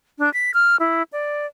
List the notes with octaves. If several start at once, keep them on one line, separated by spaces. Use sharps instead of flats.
D4
B6
F6
E4
D5